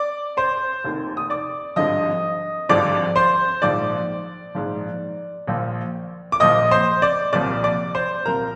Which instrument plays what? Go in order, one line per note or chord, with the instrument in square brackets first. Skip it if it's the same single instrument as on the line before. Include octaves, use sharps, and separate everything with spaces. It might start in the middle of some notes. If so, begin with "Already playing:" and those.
Already playing: [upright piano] D5 D6
C5 C6
F1 D#2 D#3
D#6
D5 D6
G#1 G2 D3 F3 D#5 D#6
G#1 G2 D3 F3 D5 D6
C5 C6
A#1 G#2 F3 D5 D6
A#1 G#2 F3
A#1 A#2 F3
D6
A#1 A#2 F3 D#5 D#6
C5 C6
D5 D6
C2 A#2 F3 D5 D6
D5 D6
C5 C6
C2 A#2 F3 A#4 A#5